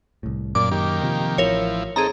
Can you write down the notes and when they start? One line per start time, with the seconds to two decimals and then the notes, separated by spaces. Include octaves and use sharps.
0.23 C2 A2
0.55 F#2 A#2 D5 D6
0.71 D#3 A#3 G4
1.03 C3 F3
1.38 A1 F3 E4 A#4 C#5
1.96 C4 D#4 G#4 A4 A#5